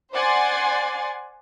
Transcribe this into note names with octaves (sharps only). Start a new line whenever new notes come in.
C5 D5 F#5 G#5 C6 A6